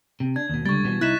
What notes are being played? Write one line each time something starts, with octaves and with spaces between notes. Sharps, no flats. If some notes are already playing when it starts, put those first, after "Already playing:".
C3
D4 G#6
D#2 B2
C#2 D3 G3 C#6 A6
B2 D#3 E3
C2 D#4 E4 F#6 B6 E7